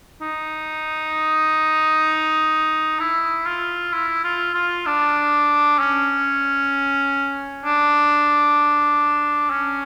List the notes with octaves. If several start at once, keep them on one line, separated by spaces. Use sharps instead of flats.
D#4
E4
F4
E4
F4
F4
D4
C#4
D4
C#4